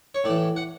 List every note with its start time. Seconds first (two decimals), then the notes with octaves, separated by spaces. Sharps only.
0.15 C#5
0.24 A2 E3 D5
0.56 F#5